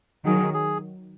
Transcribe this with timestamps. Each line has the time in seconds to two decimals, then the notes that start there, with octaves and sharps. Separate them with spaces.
0.25 D#3 F#3 G#4
0.54 G#4